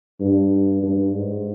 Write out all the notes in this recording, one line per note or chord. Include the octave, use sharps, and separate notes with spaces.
G2
G2
G#2